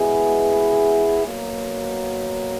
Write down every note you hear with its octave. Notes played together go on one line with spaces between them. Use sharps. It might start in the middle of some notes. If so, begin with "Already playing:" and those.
Already playing: B2 G#3 B3 E4 G#4
B2 F#3 A#3